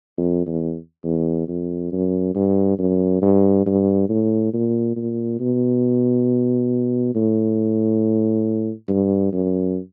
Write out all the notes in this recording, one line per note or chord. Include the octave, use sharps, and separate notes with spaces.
F2
E2
E2
F2
F#2
G2
F#2
G2
G2
A2
A#2
A#2
B2
A2
G2
F#2